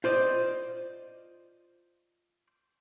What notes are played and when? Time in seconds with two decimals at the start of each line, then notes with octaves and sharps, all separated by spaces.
0.04 F4 C5 D5 D#5